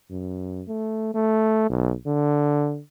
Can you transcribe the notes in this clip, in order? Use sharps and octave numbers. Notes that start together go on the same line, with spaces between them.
F#2
A3
A3
B1
D3